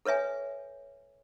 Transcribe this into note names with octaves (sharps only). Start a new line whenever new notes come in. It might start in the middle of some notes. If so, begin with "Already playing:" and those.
A4 B4 C#5 E5 G#5